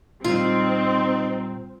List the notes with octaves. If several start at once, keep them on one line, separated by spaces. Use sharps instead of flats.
A#2 G3 C4 D#4 F4